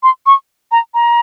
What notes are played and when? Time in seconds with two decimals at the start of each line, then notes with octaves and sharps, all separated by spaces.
0.03 C6
0.26 C#6
0.72 A#5
0.94 A#5